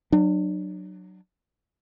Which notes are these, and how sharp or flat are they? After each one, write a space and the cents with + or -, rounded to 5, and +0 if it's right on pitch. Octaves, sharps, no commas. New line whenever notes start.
F#3 +5 D4 +35